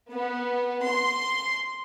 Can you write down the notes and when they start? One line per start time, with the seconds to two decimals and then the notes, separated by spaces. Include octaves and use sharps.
0.11 B3
0.85 C6